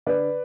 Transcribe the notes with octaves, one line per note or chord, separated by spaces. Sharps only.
D3 B4 D5